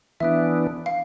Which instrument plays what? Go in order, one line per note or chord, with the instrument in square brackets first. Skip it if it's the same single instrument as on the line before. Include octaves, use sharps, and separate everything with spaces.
[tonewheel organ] E3 B3 D4 [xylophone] E5
[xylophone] F5